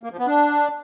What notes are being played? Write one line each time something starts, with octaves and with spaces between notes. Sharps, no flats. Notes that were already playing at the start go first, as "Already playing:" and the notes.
A#3
F3
B3
D4